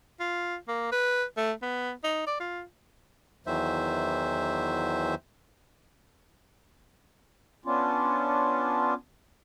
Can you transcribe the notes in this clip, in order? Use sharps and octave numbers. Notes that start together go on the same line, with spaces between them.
F4
A#3
B4
A3
B3
D#4
D5
F4
E2 D#3 E3 F#3 C5 E5
B3 C#4 D4 F4